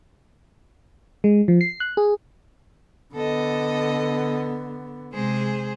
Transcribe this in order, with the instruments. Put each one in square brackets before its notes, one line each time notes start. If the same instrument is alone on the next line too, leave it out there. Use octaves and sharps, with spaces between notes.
[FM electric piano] G#3
F3
C7
F#6
G#4
[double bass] D3 B3 [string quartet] A4 D#5
[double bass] C3 [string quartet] G#3 G#4 C5